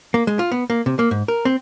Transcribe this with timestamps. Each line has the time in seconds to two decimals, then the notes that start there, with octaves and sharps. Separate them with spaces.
0.14 A#3
0.27 G#3
0.39 F4
0.52 B3
0.70 A#3
0.86 C3
0.99 A#3
1.11 G#2
1.28 A#4
1.45 C4